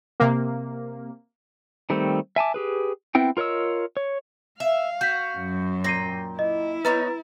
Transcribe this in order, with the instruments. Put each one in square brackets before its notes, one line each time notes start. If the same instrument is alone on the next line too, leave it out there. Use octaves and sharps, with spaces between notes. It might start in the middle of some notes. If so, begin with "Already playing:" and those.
[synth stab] C3 A#3
[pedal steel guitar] D#3 G3 A3 C4
E5 G#5 A5 D6
G4 G#4 B4
B3 C4 E4 G5
F4 A#4 C#5 D#5 E6
C#5
[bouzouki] E5 [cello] F5
[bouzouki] F#4 [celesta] G6 B6
[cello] F#2
[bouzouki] A#2 G5 [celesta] A#6 C7 D#7
[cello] E4 [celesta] D#5
[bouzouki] B3 D#4 C#5 [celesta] B4 A#5 A6